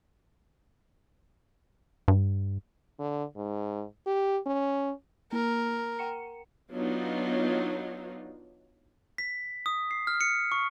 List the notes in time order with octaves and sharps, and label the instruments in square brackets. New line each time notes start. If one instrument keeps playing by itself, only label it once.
[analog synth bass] G2
[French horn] D3
G#2
G4
C#4
[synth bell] A#3 [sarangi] A#4
[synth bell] F#5 G5 C#7
[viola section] F#3 B3 D4 D#4 F4
[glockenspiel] B6
D#6
C7
F6
C#7
C#6